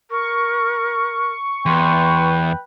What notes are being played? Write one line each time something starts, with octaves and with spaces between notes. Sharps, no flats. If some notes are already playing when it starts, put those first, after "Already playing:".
A#4 C#6
E2 B4 G5 C6